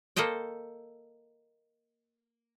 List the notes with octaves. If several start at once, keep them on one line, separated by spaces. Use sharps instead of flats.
A#3 A4 C5 D#5 G5